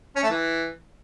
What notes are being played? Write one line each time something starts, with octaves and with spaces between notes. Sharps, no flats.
C#4
A3
E3